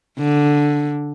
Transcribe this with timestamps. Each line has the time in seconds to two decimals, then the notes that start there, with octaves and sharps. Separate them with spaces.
0.19 D3